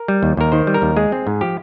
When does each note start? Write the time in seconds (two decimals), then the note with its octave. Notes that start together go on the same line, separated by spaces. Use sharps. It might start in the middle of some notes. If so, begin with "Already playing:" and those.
Already playing: A#4
0.08 G3
0.23 D#2
0.37 D#2 A#4
0.52 D#3 C5
0.67 G3
0.74 A#4
0.82 D#2
0.97 G#3 G#4
1.12 C4
1.27 G#2
1.41 F3 G4